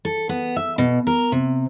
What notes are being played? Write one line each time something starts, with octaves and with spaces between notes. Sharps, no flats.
A4
B3
E5
B2
A#4
C3